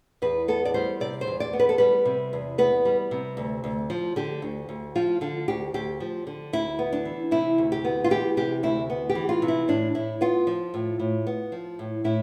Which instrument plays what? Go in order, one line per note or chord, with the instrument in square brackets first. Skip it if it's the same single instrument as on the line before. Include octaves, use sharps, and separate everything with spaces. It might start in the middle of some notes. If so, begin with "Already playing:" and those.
[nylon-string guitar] E2 B4
B3 A4
D5
G3 C5
C3 D5
C5
E2
D5
B3
B4
A4
G3 B4
C3
E2
B3 B4
G3
C3
D2
D2
F3
D3 G4
D2
D2
F3 F4
D3 F4
D2 G4
D2 G4
F3
D3
D2 E4
B3
D4
E3
C3 E4
D2
G4
B3
F4
E3 G4
C3 G4
D2 E4
B3
G4
E3
F4
C3
E4
A2 D4
A2 E4
B3 F4
F3
A2
A2
B3
F3
A2
A2 E4